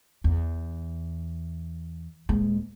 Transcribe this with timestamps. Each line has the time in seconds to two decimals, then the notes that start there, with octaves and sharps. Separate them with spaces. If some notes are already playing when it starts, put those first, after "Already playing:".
0.24 E2
2.29 D#1 G#3